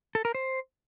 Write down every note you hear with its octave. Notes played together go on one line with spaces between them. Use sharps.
A4
A#4
C5